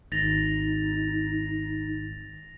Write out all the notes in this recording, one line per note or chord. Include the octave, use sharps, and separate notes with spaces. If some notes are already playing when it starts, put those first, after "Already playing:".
G#1 D#4 A6 A#6 F7